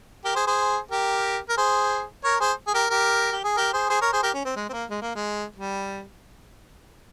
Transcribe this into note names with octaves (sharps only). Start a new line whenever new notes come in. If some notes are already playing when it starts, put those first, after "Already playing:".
G4 A#4
G#4 C5
G#4 C5
G4 A#4
A#4
G#4 C5
A#4 C#5
G#4 C5
G#4
G4 A#4
G4 A#4
G4
G#4
G4 A#4
G#4 C5
G#4 C5
A#4 C#5
G#4 C5
G4 A#4
C#4
C4
G#3
C4
A#3
G#3
A#3
G#3
G3